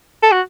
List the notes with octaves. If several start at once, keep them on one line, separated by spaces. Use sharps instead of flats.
A4
F#4